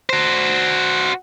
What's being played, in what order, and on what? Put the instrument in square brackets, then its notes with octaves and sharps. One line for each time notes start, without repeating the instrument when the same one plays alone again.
[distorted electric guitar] F#4 C5